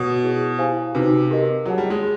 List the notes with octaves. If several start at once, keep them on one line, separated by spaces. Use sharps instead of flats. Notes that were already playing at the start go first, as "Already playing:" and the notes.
Already playing: B2 C#5
E4 G#4 C#5
E4 G4 C5 F5 G#5
C3 D#4 F#4 B4
G4 A#4 D#5
F#3 F4 G#4 C#5 F#5 A5
G3
G#3